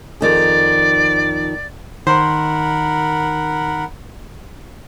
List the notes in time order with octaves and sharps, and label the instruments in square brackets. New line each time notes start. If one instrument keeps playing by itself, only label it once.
[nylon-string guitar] F2 D#3 G#4 [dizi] D5
[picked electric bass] D#3 [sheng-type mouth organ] A#4 F#5 B5 [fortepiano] C5